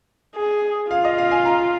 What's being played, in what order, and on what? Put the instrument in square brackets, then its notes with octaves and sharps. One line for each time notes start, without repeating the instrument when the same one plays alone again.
[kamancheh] G#4
[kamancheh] F4 [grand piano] F5
[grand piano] D#5
F5
G#5
A#5